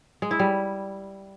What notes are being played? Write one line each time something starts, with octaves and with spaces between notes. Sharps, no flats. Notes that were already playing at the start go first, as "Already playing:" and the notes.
G#3
E4
G3